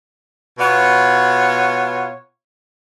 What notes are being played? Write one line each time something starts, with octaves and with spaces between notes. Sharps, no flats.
B2 B3 F4 C#5